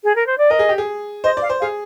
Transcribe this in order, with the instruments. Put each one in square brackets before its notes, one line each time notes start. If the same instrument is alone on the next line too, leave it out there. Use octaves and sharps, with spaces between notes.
[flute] G#4
A#4
C5
D5
[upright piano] A#4 [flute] D#5
[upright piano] G#4
G4
G#4
[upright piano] C5 [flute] D#5
[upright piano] D5
[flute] F5
[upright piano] C5
[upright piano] G#4 [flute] F5